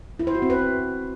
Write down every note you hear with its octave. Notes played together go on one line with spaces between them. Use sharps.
E4
C5
F#4
C4
B4